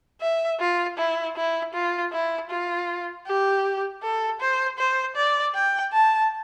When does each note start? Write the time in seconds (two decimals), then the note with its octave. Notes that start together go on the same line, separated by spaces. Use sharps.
0.21 E5
0.60 F4
0.98 E4
1.36 E4
1.74 F4
2.12 E4
2.50 F4
3.26 G4
4.03 A4
4.40 C5
4.78 C5
5.16 D5
5.54 G5
5.93 A5